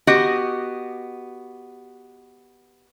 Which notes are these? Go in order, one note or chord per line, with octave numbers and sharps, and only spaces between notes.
B3 F#4 G4 D#5